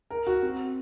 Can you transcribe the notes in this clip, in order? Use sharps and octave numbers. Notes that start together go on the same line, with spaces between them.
A#4
F#4
C4